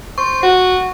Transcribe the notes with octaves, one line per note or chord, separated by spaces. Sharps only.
C5 C#6
F#4